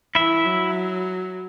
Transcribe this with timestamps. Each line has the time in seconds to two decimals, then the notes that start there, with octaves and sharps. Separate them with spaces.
0.15 E3 E4 E5
0.46 F#3